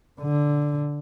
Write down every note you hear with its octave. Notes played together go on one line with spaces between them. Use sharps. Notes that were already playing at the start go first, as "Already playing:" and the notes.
D3